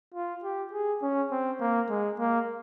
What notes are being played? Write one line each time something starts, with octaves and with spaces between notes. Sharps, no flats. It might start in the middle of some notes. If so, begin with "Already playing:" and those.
F4
G4
G#4
C#4
C4
A#3
G#3
A#3